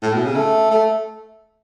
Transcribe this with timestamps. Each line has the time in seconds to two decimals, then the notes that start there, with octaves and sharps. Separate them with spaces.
0.02 A2
0.13 B2
0.25 C#3
0.36 A3
0.71 A3